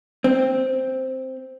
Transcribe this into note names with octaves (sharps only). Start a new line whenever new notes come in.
C4